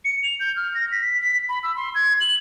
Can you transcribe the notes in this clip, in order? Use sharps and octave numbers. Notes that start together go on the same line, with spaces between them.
C#7
F7
G6
F6
A#6
B6
B6
B5
E6
C6
G#6
F#7